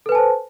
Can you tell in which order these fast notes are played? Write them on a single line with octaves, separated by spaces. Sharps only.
A4 B4 G#5 A5 C5